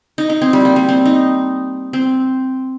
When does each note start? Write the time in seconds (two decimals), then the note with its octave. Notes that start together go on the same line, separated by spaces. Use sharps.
0.18 D#4
0.30 D#4
0.41 C4
0.53 G3
0.65 A#3
0.76 G3
0.89 C4
1.06 D#4
1.93 C4